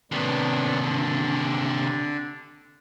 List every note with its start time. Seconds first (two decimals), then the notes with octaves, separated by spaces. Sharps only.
0.12 D#2 A2 C3 B3 D4
0.82 D3 D4